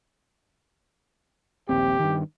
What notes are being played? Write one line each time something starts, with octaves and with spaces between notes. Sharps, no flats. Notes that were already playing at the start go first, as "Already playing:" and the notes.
A#1 D#2 C4 G4
G2 D#3